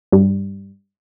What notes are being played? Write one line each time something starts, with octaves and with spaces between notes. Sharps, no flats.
G2